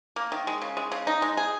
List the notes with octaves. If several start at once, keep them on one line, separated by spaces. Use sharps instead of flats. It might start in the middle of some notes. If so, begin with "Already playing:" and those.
A#3
D#3
G#3
C#3
G#3
C#3
D#4
G#3
G#4